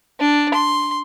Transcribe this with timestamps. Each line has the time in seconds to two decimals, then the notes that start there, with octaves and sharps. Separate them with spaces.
0.20 D4
0.54 C6